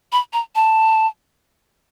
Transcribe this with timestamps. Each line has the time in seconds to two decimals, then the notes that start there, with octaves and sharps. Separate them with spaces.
0.12 B5
0.33 A#5
0.55 A5